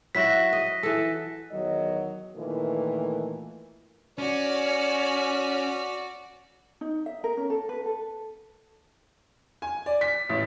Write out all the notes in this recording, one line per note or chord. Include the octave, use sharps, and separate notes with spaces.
F#3 E4 F#4 A#6 B6
D#5
E3 A4
E2 D#3 F#3 D#5
A#2 D#3 E3 A3
C#4 F#4 D5
D#4
E5
A#4
C#4
A4
B4
A4
G#5
D5
B6
A1